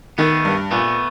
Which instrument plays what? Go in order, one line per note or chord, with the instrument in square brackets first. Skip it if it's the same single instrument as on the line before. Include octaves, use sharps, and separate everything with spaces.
[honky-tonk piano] D#3 [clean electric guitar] A3 B3
[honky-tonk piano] G2
[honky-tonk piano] A#2 [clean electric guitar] A3 B3